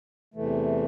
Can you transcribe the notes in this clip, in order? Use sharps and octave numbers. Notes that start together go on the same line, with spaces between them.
E2 C3 E3 A3